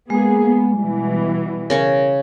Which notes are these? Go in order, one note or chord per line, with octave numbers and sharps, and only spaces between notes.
G#3 A#3 B3 G#4
B3
B2 E3 G3
C#3 C#4 A#4 C#6